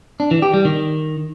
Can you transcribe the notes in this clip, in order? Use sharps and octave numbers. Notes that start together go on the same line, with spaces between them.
D4
E3
G4
G3
D#3